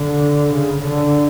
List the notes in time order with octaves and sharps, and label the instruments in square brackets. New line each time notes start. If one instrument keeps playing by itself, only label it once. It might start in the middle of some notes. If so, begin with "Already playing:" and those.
Already playing: [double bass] D3
C#3
D3